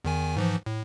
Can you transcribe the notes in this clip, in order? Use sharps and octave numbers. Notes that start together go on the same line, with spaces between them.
E2 D#3 G#5
G#2 E3 F3
A2